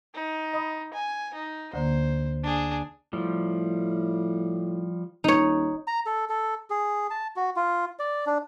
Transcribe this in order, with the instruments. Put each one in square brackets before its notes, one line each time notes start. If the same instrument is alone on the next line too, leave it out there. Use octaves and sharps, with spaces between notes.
[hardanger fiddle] D#4
[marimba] D#5 B5 D#6
[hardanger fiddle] G#5
D#4
[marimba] D2 D3 A#3 [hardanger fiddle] C5
[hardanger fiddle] D4 G#4
[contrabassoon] A2 [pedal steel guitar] F3 G3
[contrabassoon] D#1 [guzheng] D#4 C#5
[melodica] A#5
A4
A4
G#4
A5
F#4
F4
D5
D4